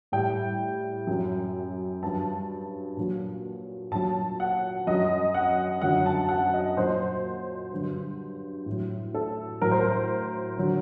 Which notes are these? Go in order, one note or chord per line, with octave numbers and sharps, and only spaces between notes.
A2 G3 G5
F#2 F#3
G2 F#3 A5
A#2 F#3
A#2 F#3 A5
F#5
F#2 F#3 D#5
F#5
F#2 D3 F#3 F#5
A5
F#5
D#5
A#2 F#3 C5
G2 D3 F#3
A2
F#3
A4
A2 F#3 A#4
C5
A#4
D3 F#3